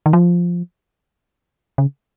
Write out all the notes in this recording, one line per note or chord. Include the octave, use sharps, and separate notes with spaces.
D#3
F3
C#3